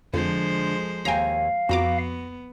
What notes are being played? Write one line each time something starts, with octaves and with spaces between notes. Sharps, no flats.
F2 D3 F3 G#3 C5
D#2 F5 G5 G#5 A#5
F2 B3 F#4 A#5 D6